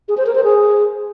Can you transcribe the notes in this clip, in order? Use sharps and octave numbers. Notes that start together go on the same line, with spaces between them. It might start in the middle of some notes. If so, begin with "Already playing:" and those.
G#4
C5
A#4
C5
G#4